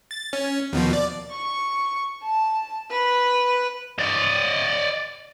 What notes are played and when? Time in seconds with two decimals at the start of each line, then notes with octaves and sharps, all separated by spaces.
0.11 A6
0.33 C#4
0.73 D#2 B2 F3
0.93 D5
1.31 C#6
2.23 A5
2.91 B4
3.98 D5 D#5